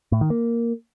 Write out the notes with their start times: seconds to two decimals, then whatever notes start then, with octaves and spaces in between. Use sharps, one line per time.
0.12 A2
0.21 D#3
0.30 A#3